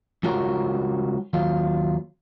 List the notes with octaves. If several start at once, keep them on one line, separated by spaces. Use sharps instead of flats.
C#2 G3 F4 F#4 A#4 C#5
D#2 F#3 F4